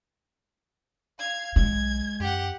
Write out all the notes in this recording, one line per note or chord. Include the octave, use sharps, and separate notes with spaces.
F5 G#6
B1 G#3 G#6
F#2 G4 F#5